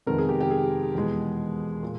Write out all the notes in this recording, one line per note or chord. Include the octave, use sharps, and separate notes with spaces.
F2 C3 D#3 G#3 B3 A#4
G#4
G4
G4
G#4
E2 B2 G#3 B3
A#2